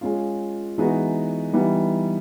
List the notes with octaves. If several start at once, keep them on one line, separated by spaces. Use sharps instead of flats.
G#3 C#4 F4
E3 G#3 B3 D#4 F#4
E3 G3 B3 D#4